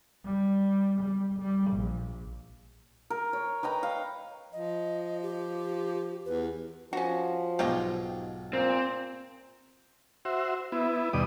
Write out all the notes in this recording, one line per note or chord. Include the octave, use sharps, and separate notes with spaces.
G3
G3
G3
A#1
A#4
C#5
B4 D#5 G5 A#5
F5
F3 D#5
G4
E2 B4
F3 C#4 F#4
B1 G#2 F4 G4 C#5 D#5
A#2 C4
F#4 C5 E5
B3 E4
D#2 B2 G3 D5 D#6